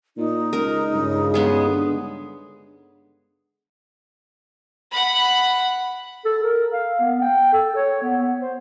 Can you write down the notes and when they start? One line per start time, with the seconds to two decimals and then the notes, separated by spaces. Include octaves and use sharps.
0.17 A#2 D#4
0.53 C#2 A#4
0.94 G2 C#3
1.34 G#3 B3 G#4
1.68 D3
4.91 F#5 B5
6.25 A4
6.43 A#4
6.73 F5
7.00 B3
7.21 G5
7.53 A4
7.76 C#5
8.02 B3
8.21 B3
8.41 C5